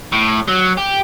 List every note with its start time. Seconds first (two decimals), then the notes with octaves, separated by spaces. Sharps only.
0.13 A2
0.48 F#3
0.78 G4